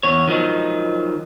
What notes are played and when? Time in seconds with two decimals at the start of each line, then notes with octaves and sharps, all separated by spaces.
0.03 E2 C#5
0.27 D#3 F3 F#3 D#4